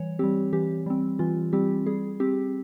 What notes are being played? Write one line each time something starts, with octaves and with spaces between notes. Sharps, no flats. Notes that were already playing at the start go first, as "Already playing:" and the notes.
Already playing: E3 G3 C#5
G3 C4 G4
E3 G4
G3 C4
E3 F4
G3 C4 G4
G3 G#4
C4 G4